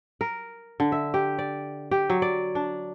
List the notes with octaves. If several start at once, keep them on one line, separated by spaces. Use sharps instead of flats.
A#4
D3
E5
G4
D5
G4
F#3
D5
D4